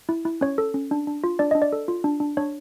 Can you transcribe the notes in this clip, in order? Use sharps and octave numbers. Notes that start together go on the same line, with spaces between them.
E4
E4
C#4 C#5
A4
C#4
D4
D4
F4
D4 D5
D4 D#5
D5
A4
F4
D4
D4
D4 C#5